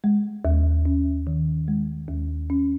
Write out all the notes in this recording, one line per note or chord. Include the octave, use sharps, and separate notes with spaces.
G#3
D#2
C#4
D#3
G#3
D#2
C#4